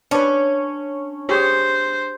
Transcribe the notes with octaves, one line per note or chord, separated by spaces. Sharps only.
C#4 D4 B4 D5 A5
G4 G#4 C5 C#5